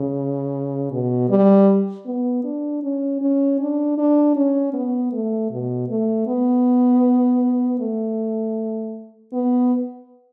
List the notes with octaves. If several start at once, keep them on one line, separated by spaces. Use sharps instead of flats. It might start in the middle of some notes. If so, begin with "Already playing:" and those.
Already playing: C#3
B2
G3
B3
D4
C#4
C#4
D4
D4
C#4
B3
A3
B2
A3
B3
A3
B3